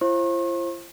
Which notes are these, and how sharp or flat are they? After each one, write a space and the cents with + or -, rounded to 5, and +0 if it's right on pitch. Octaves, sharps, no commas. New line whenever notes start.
F4 -45 C5 +30 C#6 -45